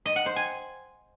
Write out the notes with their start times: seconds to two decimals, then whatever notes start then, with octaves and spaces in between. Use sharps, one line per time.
0.06 D#5
0.16 F#5
0.26 C5
0.36 G#5